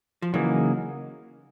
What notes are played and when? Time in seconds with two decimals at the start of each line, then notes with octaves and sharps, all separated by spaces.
0.22 F3
0.34 C#3 E3 F#3 A#3 D#4 G#4